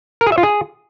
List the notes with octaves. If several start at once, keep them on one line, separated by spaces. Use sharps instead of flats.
A#4
G#4
E5
F4
G#4